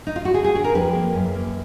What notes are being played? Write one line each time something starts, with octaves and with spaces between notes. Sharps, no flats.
D#4
F4
F#4
D3 G#4
G#4
D4 G#4
A#4
F2 B4
A#3
F#2
A#3